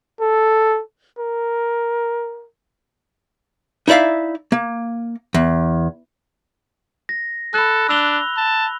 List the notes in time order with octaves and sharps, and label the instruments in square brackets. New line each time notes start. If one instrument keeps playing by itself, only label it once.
[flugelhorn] A4
A#4
[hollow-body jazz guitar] D#4 E4 D5 E5 F5
A#3
E2
[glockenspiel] A#6
[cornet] A4 [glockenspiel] B5 F#6
[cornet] D4 [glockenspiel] E6 F7 G7
[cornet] A5